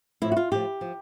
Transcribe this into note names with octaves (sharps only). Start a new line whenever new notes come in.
A2 F3 E4
F#4
F4
A2 F3 G4
F3